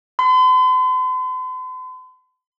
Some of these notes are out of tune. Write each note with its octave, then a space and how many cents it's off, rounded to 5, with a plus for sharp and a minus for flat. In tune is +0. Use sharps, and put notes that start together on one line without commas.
C6 -45